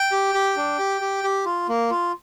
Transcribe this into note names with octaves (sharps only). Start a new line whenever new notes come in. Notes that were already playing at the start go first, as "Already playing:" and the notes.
Already playing: G5
G4
G4
D4
G4
G4
G4
F4
A#3
F4